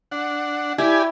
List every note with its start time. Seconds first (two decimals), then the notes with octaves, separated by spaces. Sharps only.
0.11 D4 F#5
0.78 E4 G4 D5 G#5